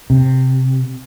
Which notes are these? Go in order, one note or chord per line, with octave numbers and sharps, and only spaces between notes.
C3